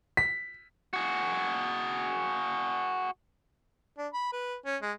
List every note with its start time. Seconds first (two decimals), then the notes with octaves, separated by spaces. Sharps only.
0.17 B6
0.93 F#4 G#4
3.98 D4
4.13 B5
4.32 B4
4.65 C#4
4.82 G#3